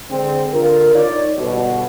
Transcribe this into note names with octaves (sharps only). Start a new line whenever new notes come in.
D3 G#3 C4
D3 F4 A#4
D#4 C#5 D5
G1 B2